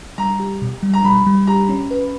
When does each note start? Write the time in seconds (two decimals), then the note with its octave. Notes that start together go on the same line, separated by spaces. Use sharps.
0.18 G3 A#5
0.40 G4
0.62 B2
0.83 G3
0.94 A#5
1.05 G3 B5
1.27 G3
1.47 G4 A#5
1.69 C#4
1.91 B4